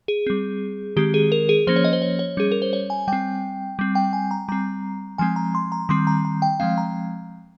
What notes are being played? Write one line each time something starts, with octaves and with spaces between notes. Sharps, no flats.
G#4
G3 C4
D#3 G#3 C4 G4
G#4
A#4
G#4
F3 A#3 C#4 C5
C#5
D#5
C5
C#5
C#5
G3 C#4 G#4
A#4
C5
C#5
G#5
G3 C4 G5
G3 C4
G5
G#5
A#5
G3 C4 A#5
F3 G#3 C4 G#5
A#5
C6
A#5
D#3 G3 C4 C6
A#5
A#5
G5
F3 G#3 C4 F5
A#5